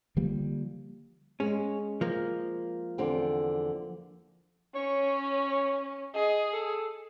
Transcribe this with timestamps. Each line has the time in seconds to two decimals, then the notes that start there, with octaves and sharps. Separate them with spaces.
0.17 D3 F3 G3 A#3
1.40 G#3 C#4
2.01 F3 A#3
2.98 E2 D3 C4
4.75 C#4 C#5
6.15 G#4 D#5
6.53 A4